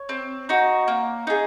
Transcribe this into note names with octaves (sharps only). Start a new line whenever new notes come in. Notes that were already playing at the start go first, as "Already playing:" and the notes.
Already playing: C#5
C4
D#4 F#4
A#3
D#4 G#4